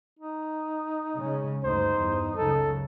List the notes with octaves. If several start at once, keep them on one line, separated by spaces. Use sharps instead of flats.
D#4
C#3 G#3 C#4
D2 G2 D#4 C5
E2 G2
C#2 F#2 C#3 A4